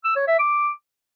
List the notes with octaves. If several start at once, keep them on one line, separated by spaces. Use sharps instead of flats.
E6
C#5
E5
D6